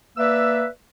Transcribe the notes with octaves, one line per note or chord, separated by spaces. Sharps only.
A#3 B4 D5 E5 E6